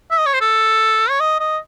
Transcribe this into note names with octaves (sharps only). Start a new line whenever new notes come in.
E5
D#5
C#5
C5
A4
C#5
D#5
D#5